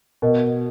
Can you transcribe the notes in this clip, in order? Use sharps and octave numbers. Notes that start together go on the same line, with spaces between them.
B2 A#4 D#5